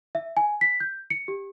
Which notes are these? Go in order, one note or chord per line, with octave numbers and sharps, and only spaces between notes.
E5
G#5
B6
G6
C#7
G4